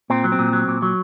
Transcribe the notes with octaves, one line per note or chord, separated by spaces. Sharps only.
A#2 C4
F#3
C4
A#2
F#3
A#2
F#3